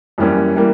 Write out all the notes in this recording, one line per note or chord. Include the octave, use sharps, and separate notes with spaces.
F#2 E3 G3 A#3 C#4
E3 G3 A#3